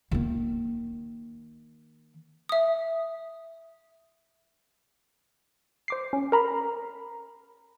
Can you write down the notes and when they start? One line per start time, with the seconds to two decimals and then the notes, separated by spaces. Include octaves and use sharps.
0.11 D#3 A#3
2.49 E5 D#6
5.88 C5 D6 C7
6.13 C#4
6.32 A#4 A#5 B5